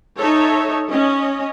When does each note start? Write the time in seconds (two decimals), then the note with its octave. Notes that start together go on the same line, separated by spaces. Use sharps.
0.19 D#4 A4 C#5 E5
0.89 C#4 D#5